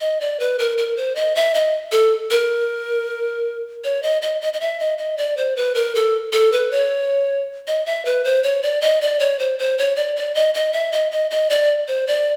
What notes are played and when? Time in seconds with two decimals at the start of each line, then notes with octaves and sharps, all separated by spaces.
0.01 D#5
0.21 D5
0.40 B4
0.59 A#4
0.78 A#4
0.97 C5
1.15 D#5
1.35 E5
1.54 D#5
1.92 A4
2.31 A#4
3.84 C#5
4.03 D#5
4.22 D#5
4.41 D#5
4.53 D#5
4.61 E5
4.80 D#5
4.98 D#5
5.17 D5
5.37 C5
5.56 B4
5.75 A#4
5.95 A4
6.33 A4
6.52 B4
6.71 C#5
7.67 D#5
7.86 E5
8.05 B4
8.24 C5
8.43 C#5
8.63 D5
8.81 D#5
9.01 D5
9.19 C#5
9.39 C5
9.59 C5
9.78 C#5
9.96 D5
10.16 D5
10.35 D#5
10.54 D#5
10.73 E5
10.92 D#5
11.12 D#5
11.31 D#5
11.50 D5
11.88 C5
12.07 D5